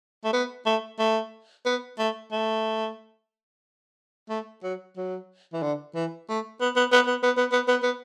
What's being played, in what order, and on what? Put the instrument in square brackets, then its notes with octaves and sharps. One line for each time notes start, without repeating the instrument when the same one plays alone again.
[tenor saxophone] A3
B3
A3
A3
B3
A3
A3
A3
F#3
F#3
E3
D3
E3
A3
B3
B3
B3
B3
B3
B3
B3
B3
B3